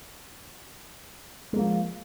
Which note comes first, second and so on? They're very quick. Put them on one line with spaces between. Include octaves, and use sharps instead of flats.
G#3 A#3 F3